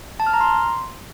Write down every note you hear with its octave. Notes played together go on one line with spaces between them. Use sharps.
A5
F6
A#5
C6